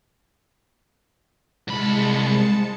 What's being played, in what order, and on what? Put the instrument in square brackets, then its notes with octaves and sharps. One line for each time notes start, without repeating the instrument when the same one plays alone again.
[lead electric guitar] C2 B5 [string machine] G#3 A5 C#7